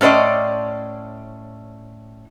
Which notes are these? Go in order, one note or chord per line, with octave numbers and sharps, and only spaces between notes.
A2 C#4 C5 D5 D#5